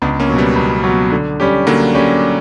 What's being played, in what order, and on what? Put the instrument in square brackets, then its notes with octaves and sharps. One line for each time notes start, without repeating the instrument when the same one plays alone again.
[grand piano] C#2 [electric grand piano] B3 D4
[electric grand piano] A#3 C#4
[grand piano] B2 F#3
[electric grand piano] G3 B3
[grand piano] C#2
B2 F#3
D3
G3 C#4 G4
[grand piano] D3 [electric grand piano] F#3 A#3
[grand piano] G3 C#4 G4